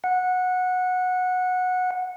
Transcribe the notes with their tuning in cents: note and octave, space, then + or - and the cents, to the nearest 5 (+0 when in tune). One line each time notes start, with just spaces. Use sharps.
F#5 -15